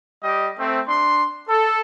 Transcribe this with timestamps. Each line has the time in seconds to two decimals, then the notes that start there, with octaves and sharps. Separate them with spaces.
0.24 G3 G4 D#5
0.58 A3 C4
0.88 D4 C6
1.48 A4